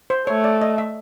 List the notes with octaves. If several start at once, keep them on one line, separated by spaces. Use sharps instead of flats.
C5
A3 C#5
D5
D#5
E5